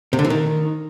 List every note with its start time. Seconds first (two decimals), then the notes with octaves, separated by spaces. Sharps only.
0.13 C3
0.19 D3
0.25 E3
0.30 D#3